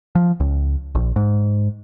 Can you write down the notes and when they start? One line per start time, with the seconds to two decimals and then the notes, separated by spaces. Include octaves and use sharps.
0.15 F3
0.40 C#2
0.95 A#1
1.16 G#2